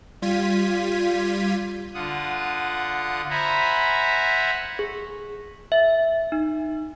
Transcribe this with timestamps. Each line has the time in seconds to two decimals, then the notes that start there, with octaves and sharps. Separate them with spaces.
0.22 G3 F4 G#6 B6 D#7
1.94 D3 F4 F#5 D#6
3.30 C5 E5 F#5 G#5 A#5 B5
4.79 G#4
5.72 E5
6.32 D#4